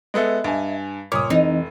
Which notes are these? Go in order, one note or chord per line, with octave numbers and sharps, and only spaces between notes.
G#3 B3 A4 D#5 E5
G2 G#5
C#2 G2 A#2 C#5 D6 D#6
F1 E3 C4 D#4